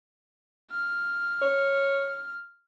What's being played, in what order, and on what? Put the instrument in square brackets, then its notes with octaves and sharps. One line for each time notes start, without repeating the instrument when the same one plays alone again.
[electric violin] F6
[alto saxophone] C#5